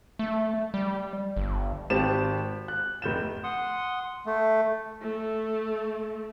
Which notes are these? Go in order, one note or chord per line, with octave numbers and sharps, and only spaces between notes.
A3
G3
G1
G#1 C4 G4 A5 E7
F#6
F1 G6 E7
F#5 C6 D#6
A3
A3